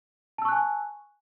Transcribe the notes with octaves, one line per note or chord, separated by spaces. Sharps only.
G#5 A5 C#6 E6 F#6